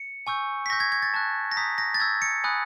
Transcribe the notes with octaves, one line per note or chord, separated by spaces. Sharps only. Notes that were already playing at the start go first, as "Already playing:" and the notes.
Already playing: C#7
G#5 C#6 E6 G6
B6
C#6 E6 G6 A#6
G#6
G#6
A6
A5 C#6 F#6
A#6
A#5 D#6 G6 B6
A#6
A6
C#6 E6 G6 G#6
C#7
G#5 B5 D#6 F#6